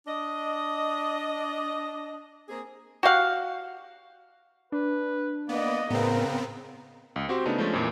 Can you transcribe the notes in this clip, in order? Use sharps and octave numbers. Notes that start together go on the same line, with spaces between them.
D4 D#5
A#3 C4 G#4
F#4 G4 F5 F#5
D4 B4
A#3 B3 D5 D#5
A2 C#3 B3 C4 A#4
C#2
C4 F#4 G4 C5
C#3 A3 B3 D4 D#4
F3 G#3 A3 C#4 D4
F2 A#2 E3